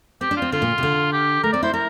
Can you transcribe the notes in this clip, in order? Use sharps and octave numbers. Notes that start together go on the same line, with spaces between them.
C4 G4
D4
F4
C4
D3 F4
A#2
C3
D3
G4
A3 A#4
C4 D5
E4 C5
E4 A#4